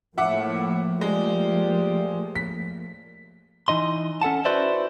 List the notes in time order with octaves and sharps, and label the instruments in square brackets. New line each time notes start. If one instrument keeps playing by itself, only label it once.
[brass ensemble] A2 [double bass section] F3 A3 A#3 [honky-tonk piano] E5 F#5 D6
[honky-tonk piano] G#3 [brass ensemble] F4 G4 D5
[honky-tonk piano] B6
[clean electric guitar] E3 D#4 D#5 C6
C#4 A4 F#5 A5
E4 F#4 B4 C5 D5 E5